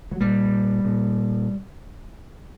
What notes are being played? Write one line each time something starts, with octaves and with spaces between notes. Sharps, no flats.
F#3
A#2 G3
A#2